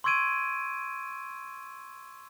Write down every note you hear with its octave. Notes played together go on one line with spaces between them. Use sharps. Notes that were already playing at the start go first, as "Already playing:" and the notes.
C6 C#6 E6 G#6 D7 D#7